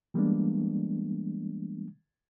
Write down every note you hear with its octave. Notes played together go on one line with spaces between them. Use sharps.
E3 G3 G#3 A#3 B3 D4